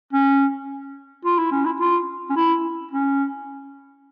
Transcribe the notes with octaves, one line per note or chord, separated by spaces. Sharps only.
C#4
F4
E4
C#4
E4
F4
C#4
E4
C#4